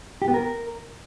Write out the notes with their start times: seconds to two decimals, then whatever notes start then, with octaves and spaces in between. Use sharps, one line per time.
0.22 G4
0.28 B3
0.34 A#4